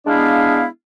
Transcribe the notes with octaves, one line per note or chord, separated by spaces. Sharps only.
G#3 B3 D4 E4 D5 F5